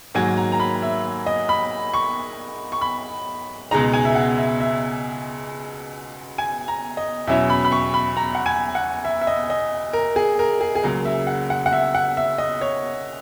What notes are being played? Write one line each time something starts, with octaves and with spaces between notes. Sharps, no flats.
G#2 D#3 F#3 A#3 G#5
A#5
A#5
B5
E5
D#5
B5
C#6
C#6
B5
C#2 B2 G#3 D#4 A#5
G#5
E5
F#5
E5
E5
G#5
A#5
D#5
E2 B2 F#3 C#4 E4 E5
B5
B5
C#6
B5
A#5
F#5
G#5
F#5
E5
E5
D#5
D#5
A#4
G#4
A#4
G#4
G#4
C#2 C#3 F#3 A#3 A#4
E5
F#5
F#5
F#5
E5
F#5
E5
D#5
C#5